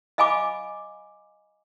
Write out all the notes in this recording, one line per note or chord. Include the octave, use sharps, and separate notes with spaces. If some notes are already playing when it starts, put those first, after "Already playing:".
D#5 F5 G#5 B5 D6